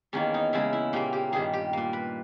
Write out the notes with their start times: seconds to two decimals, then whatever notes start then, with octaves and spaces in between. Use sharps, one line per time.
0.13 E2 D#3 A#3 C#4
0.34 D#4
0.53 E2 C#3 G#3 E4
0.73 E4
0.93 A#2 A#3 G4
1.13 G4
1.32 G2 D#3 A#3 G#4
1.53 G4
1.73 A#2 A#3
1.93 B4